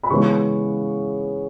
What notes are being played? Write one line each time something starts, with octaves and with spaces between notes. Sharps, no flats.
B5
C#3 E3 G#3 B3 C#6